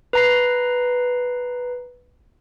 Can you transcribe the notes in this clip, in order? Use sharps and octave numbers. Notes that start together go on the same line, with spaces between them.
B4 A#5 C7